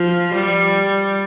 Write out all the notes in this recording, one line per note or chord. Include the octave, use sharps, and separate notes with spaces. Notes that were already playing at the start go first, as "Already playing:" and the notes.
Already playing: F3
G3